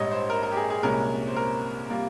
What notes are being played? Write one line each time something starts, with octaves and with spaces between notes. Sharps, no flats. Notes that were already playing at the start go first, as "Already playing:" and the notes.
Already playing: A#1 G#2 G3 C#5 D#5
C5
A#4
A#4
G4
G#4
G#4
C2 A#2 G#3 C#4 A#4
C5
A#4
C3 G3 A#3 F4